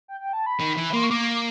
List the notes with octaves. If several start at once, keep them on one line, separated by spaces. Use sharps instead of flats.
G5
G5
A5
B5
D#3
E3
A#3 C6
C#6
A#3 D6
D6